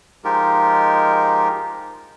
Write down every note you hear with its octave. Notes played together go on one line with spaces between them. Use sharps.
F3 G#3 D#4 F4 G4 A#4